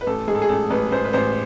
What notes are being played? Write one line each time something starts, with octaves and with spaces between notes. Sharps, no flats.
B4
A1 A4
G#2 G#4
A4
G#4
A1 A4
A1 B4
A1 C5
B4
A1 C5